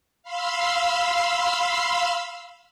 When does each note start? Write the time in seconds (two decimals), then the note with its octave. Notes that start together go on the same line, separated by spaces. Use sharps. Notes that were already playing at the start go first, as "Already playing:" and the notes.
0.23 F5 B5 C6 E6